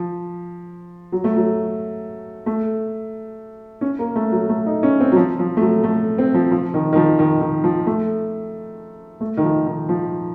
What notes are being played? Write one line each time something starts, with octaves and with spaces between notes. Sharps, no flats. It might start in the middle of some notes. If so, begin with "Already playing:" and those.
Already playing: F3
F#3
A3
F#3
A3
C#4
A#3
A3
F#3
A3
D#4
C#4
C4
F#3
F3
F3
A3
F#3
A3
C4
F3
F3
D#3
D#3
F3
D#3
D#3
F3
A3
A3
D#3
F3
D#3
F3